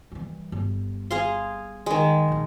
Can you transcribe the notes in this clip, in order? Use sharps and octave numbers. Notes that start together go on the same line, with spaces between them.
E3 G3
G1
G#4 F5 C6
D#3 G#3
A#1 D#4